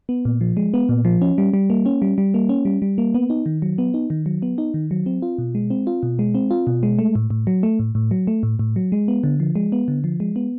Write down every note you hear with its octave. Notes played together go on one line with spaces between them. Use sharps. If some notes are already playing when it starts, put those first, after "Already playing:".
B3
A#2
F3
G#3
B3
A#2
F3
C#4
G3
G3
A#3
C#4
G3
G3
A#3
C#4
G3
G3
A#3
B3
D#4
D#3
F#3
B3
D#4
D#3
F#3
B3
D#4
D#3
F#3
C4
F4
B2
G#3
C4
F4
B2
G#3
C4
F4
B2
G#3
A3
A2
A2
F#3
A3
A2
A2
F#3
A3
A2
A2
F#3
G#3
B3
D3
F3
G#3
B3
D3
F3
G#3
B3